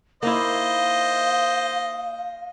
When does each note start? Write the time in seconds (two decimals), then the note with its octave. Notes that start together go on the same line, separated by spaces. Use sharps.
0.23 A#3 D#4 E4 C5 D#5 F5